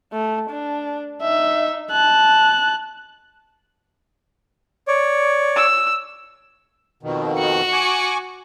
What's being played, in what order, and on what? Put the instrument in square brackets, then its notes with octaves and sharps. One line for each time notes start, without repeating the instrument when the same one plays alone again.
[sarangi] A3
D4
[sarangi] D#4 [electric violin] E5
[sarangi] A5 [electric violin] F#6
[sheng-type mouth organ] C#5 D5
[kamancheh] E6
[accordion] F2 B2 D#3
[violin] F#4 C#7
[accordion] G#5 C#6 D6